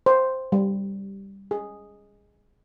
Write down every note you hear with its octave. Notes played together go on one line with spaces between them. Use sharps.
C5
G3
G#4